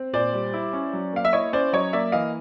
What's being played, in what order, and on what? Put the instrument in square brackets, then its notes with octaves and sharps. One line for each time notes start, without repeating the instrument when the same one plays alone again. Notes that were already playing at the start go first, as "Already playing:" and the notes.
Already playing: [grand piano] C4
A#2 C5 D5
G3
E4
C#4
F#3
A#3 F5
E5
E4 C#5 D#5
C#4 C5 D5
F#3 C#5 D#5
A#3 D5 E5
E3 D#5 F5